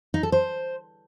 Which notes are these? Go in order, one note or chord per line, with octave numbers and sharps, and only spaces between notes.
D#4
A4
C5